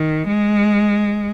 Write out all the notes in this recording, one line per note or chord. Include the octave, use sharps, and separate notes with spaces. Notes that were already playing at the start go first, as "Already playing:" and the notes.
Already playing: D#3
G#3